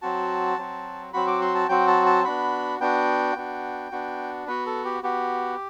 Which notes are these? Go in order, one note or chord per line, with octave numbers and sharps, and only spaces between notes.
F#3 C4 F#4 A5
F#3 C4 F#4
F#3 C4 F#4 B5
D6
C6
A5
F#3 C4 F#4 G5
A5
A5
B3 D4 F#4 B5
B3 D4 F#4 G5
B3 D4 F#4
B3 D4 F#4
B3 F#4 B4
A4
G4
B3 F#4 G4